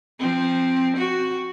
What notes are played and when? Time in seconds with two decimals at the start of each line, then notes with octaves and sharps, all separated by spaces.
0.19 F3 C4
0.96 F#4